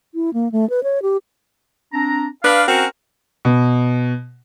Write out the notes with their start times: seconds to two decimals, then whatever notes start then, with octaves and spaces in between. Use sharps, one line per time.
0.15 E4
0.34 A#3
0.52 A3
0.70 B4
0.83 C#5
1.02 G4
1.93 C4 D4 A#5
2.44 D4 B4 F5
2.68 C4 C#4 F#4 A#4
3.45 B2